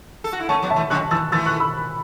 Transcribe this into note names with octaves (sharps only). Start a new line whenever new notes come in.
A4
F#4
E4
A3 C#4 A5 C#6
F#3 B3
E5 A5
E3 A3
C#3 F#3 C#6 F#6
E3 E6 A6
E3 A3 E6 A6
C#6 F#6
B5 E6